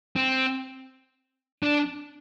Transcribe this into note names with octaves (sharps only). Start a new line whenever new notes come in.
C4
D4